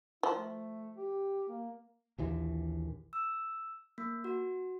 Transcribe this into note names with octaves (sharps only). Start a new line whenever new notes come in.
F3 E4
A3
G4
A#3
A#1 D#2 E3
E6
A#3
F#4